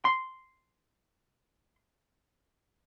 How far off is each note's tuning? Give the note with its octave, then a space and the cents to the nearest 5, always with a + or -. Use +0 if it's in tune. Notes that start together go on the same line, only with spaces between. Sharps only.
C6 -5